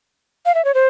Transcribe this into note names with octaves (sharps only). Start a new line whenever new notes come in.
F5
E5
C#5
C5